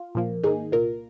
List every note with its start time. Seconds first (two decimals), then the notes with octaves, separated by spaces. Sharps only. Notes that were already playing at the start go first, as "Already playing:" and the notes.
Already playing: F4
0.15 A#2 F3 A#3
0.43 G#2 D#3 A#3 D#4 G#4
0.72 C2 A#2 A#3 F4 A#4